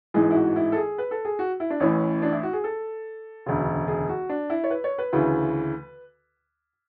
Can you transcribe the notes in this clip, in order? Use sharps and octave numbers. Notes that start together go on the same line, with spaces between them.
A1 G#2 E3 G#4
E4
F#4
E4
A4
G#4
B4
A4
G#4
F#4
E4
D4
A1 A2 E3 C#4
D4
E4
F#4
G#4
A4
E1 D2 C#3
G#4
F#4
D4
E4
C#5
B4
C#5
B4
D2 C#3 E3